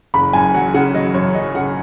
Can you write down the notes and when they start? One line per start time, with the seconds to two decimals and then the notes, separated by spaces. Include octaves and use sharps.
0.14 F#1 B5
0.33 F#2 G#5
0.54 F#3 F#5
0.74 C#3 F#5
0.94 F#3 D#5
1.14 F#2 C#5
1.35 F#3 D#5
1.55 C#3 F#5